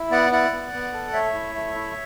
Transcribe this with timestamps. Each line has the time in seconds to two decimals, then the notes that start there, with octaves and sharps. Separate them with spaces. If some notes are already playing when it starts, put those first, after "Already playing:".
Already playing: E4
0.11 B3 D5 F#5
0.31 E4 D5 F#5
0.52 B3
0.73 B3
0.93 A4
1.13 A3 C#5 E5
1.34 E4
1.54 A3
1.75 E4